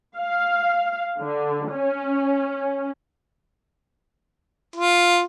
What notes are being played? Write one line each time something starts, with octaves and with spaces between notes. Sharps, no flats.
F5
D3
C#4
F4